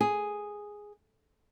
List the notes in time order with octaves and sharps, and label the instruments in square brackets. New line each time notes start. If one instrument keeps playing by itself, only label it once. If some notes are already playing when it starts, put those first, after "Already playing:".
[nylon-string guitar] G#4